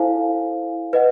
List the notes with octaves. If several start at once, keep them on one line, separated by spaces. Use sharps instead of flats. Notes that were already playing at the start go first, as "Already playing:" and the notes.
Already playing: E4 A4 C5 F5 G#5
B4 D#5 F#5